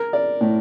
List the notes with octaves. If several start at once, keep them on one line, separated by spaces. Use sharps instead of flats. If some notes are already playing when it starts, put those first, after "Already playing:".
Already playing: A#4
D5
A2